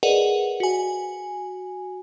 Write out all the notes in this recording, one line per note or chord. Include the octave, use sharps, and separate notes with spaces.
G#4 A#4 B4 D5 D#5 F#5
F#4 G#5